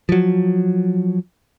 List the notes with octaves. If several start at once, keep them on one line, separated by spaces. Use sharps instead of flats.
F3 F#3